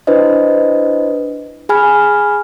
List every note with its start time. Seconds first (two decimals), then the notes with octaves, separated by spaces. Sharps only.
0.07 D4 E4 B4 C5 D#5
1.69 G#4 G#5 B5 F6